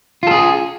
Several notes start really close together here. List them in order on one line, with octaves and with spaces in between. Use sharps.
F4 A4 G#4